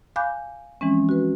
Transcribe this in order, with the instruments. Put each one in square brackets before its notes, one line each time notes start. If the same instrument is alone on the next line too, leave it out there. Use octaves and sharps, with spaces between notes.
[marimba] F5 G#5 B5 D6 F#6 G6
E3 F3 G#3 C4 C#4
F#4 B4